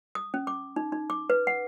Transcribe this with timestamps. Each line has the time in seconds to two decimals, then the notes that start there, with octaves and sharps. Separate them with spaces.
0.15 D#6
0.34 C#4
0.47 D6
0.76 D#4
0.92 D#4
1.10 D6
1.30 B4
1.47 F#5